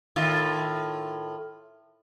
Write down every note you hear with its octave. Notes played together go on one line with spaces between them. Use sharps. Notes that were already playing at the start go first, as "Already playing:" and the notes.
A2 D#3 F4